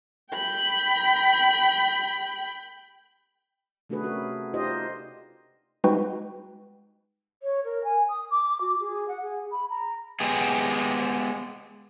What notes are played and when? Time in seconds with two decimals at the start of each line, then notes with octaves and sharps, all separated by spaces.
0.34 G5 B5
3.89 C3 A3 D4 F#4 G#4 B4
4.03 C#4 F#4 A#4
4.54 D#4 F4 G4 C5 D5 D#5
5.84 G3 G#3 D#4 F#4 B4 G5
7.43 C#5
7.64 A#4
7.84 G#5
8.09 D#6
8.30 D6
8.61 F#4
8.80 G#4
9.08 F#5
9.22 G#4
9.51 B5
9.70 A#5
10.20 G#3 B3 G4 G#4